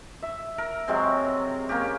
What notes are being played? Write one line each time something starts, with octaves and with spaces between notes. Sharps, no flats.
E5
A#4
C3 F#3 G#3 C4
A#3 C#4 G4